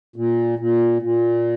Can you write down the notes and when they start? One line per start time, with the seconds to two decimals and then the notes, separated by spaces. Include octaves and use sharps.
0.16 A#2
0.59 A#2
1.02 A#2